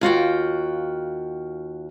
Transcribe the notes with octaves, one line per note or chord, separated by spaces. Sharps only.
D#2 F4 F#4 G5